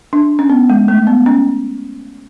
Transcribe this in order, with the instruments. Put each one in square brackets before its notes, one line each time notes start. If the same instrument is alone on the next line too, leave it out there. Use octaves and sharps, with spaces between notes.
[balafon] D4
C#4
B3
G#3
A3
B3
C#4